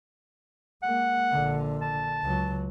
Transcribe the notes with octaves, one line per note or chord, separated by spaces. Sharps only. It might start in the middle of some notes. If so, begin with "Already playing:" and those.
G#3 A#3 F#5
A#1 D3
A5
C#2 F#3